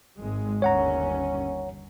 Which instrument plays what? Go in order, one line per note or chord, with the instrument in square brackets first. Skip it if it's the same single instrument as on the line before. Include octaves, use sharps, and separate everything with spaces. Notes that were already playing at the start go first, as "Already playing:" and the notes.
[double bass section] G#1 G#3
[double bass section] G1 D#2 C#4 [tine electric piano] C#5 F#5 A#5